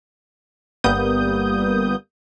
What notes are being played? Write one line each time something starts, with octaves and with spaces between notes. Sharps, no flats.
G1 G3 A#3 B3 D#6 G6